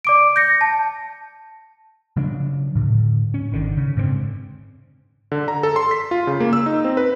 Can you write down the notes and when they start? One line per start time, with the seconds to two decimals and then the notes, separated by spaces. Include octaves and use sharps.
0.05 D5 D6 D7
0.36 G6 A#6 C#7
0.61 A5
2.17 C#3 F3 F#3 D4
2.75 A2 D3
3.34 C#4
3.52 G#1 D3 D#3
3.77 C#3
3.97 G#2 D3 A3 C4
5.32 D3
5.48 A#5
5.63 A4
5.76 C6
5.91 B6
6.11 F4
6.27 C#3
6.40 A#3
6.53 E6
6.66 D#4
6.85 C4
6.97 B4